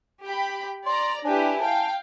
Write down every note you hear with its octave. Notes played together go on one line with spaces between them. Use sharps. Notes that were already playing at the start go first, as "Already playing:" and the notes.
G4 G5 B5
D5 A#5 C6
D4 E4 G4 B4 G#5
F5 G5 A5